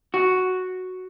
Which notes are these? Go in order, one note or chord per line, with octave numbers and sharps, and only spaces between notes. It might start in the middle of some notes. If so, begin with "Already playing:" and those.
F#4